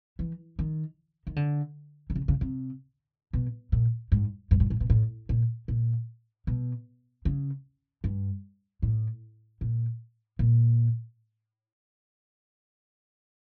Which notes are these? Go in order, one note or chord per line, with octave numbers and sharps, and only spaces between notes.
E3
D#3
D#3
D3
D3
C#3
C#3
C3
B2
A#2
G#2
G2
G#2
A2
B2
A2
A#2
A#2
B2
C#3
G2
A2
A#2
A#2